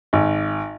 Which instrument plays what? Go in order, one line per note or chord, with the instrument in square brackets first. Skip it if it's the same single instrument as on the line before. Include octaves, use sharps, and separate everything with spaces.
[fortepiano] G#1